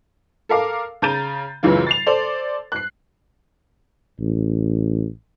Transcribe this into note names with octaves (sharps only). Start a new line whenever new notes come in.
A4 A#4 F5 D6
C#3 A#5 G6 A6 D#7
C#2 F#2 C#3 E3 F4
A6 C7 F7
A4 C5 D5
F#6 C7
A1